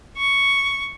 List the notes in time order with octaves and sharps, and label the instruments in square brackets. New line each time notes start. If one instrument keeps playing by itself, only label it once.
[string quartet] C#6